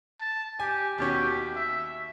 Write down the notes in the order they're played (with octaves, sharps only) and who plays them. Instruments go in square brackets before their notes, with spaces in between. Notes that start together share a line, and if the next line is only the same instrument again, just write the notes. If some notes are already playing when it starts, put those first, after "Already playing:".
[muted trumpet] A5
[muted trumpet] G4 [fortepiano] G#5
[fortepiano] D#2 B2 C#4 [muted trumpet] G4
[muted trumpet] E5